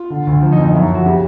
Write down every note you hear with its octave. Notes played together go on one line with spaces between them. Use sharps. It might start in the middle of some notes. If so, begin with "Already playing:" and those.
Already playing: F4
D3
D2
F3
D#4
F2
D#4
F#2 E4
E4
F3 F#4
C#3 G4